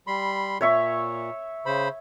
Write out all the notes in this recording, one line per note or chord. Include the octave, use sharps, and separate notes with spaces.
G3 B5 C6
A#2 C#5 E5 C#6
C#3 C5 B5